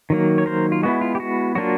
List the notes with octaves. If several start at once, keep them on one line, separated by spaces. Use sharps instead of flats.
D#3 F#3 A#3
C#5
A#4 C5
F4
G#3 B3 E4 F#4
F4
G4
F#4
F#3 A#3 D4 F4 F#4